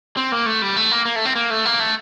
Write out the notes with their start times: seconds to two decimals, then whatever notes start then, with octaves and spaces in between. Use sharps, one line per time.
0.17 C4
0.32 A#3
0.46 A3
0.62 G3
0.76 A3
0.91 A#3
1.05 A#3
1.16 A3
1.25 C4
1.35 A#3
1.50 A3
1.65 A#3
1.80 A3